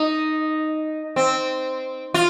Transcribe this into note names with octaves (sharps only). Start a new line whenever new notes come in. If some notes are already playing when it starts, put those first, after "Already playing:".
Already playing: D#4
C4
F4